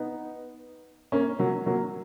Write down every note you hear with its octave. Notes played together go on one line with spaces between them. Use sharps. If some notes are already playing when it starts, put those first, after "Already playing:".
Already playing: B3 D#4
A#3 C#4
F#3 A#3
F#3 A#3